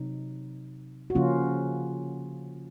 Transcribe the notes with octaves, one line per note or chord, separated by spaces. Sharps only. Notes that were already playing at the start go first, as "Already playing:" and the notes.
Already playing: C3 F#3 C4 D#4
F#4
C#3 F3 A#3 C#4 F4